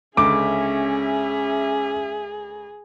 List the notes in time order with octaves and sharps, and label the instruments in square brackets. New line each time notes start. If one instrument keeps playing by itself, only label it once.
[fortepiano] C#2 D3 [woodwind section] C#4 E5 [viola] G#4 [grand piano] D6